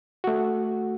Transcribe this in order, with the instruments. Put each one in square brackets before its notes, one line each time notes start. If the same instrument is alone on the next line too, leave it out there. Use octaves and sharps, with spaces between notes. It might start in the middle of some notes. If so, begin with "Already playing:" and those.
[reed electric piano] A3 F#4